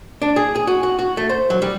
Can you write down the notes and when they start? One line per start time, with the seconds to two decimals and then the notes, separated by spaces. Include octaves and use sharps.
0.22 D4
0.36 G#4
0.56 G#4
0.67 F#4
0.83 F#4
0.99 F#4
1.17 A3
1.29 C5
1.50 F#3
1.62 G3